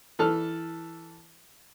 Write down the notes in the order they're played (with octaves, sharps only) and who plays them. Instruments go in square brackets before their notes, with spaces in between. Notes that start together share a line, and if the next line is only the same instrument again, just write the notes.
[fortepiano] E3 A4 A5 F6